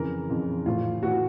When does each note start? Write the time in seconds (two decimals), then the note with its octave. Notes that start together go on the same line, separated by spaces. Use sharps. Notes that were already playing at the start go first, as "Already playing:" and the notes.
Already playing: F2 C#3 E3 A#4
0.29 F2 C#3 E3
0.66 A2 E3 F4
1.03 A2 E3 F#4